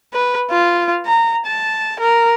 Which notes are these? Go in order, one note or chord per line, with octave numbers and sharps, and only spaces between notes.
B4
F4
A#5
A5
A#4